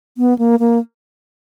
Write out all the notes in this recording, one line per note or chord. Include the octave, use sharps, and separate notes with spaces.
B3
A#3
A#3